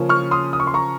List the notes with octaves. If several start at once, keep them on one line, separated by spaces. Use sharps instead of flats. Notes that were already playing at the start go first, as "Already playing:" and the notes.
Already playing: C#3 F3 A#3 C#4
C#6 F6
C6 D#6
D#6
C#6
C6
A#5 C#6